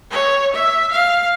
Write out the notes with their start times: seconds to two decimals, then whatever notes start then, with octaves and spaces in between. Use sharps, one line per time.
0.11 C#5
0.53 E5
0.91 F5